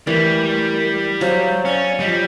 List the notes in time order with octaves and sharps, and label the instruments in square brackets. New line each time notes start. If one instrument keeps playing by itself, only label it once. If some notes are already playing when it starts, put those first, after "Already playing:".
[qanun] E3 [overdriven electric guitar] G3 [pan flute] A3 [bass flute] A#4
[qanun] F#3 [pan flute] C5 [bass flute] F5
[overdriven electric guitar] C#4 [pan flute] D5
[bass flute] F3 [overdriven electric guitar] G3 [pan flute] D#5